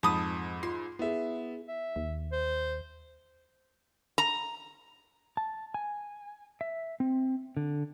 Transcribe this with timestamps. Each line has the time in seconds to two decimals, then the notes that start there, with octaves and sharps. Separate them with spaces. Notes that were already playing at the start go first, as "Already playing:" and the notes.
0.03 F2 G#2 A5 B5 D#6
0.63 F4 C6
0.99 B3 E4 G#4 E5
1.68 E5
1.96 D#2
2.32 C5
4.18 A#5
5.37 A5
5.74 G#5
6.61 E5
7.00 C4
7.57 D3